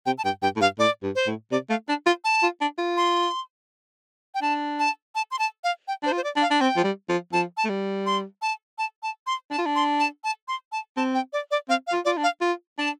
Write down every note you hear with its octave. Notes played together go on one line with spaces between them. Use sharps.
C3 G5
A5
G2 G5
G2 G5
A2
G2 F5
A2 D5
G2
C5
A2
C3 D5
A3 F5
D4 A5
F4 C6
A5
F4
D4
F4
C6
G5
D4 A5
A5
A5
C6
A5
F5
G5
D4 C5
F4
C5
D5
D4
F5
D4
C4 G5
F3
G3
F3
F3 A5
A5
A3
G3
C6
A5
A5
A5
C6
D4 A5
F4
D4
C6
A5
A5
C6
A5
C4 A5
G5
D5
D5
C4 F5
F5
F4
F4 D5
D4
F5
F4
D4 A5